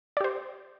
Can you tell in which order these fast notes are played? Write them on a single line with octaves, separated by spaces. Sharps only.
D5 G4 C5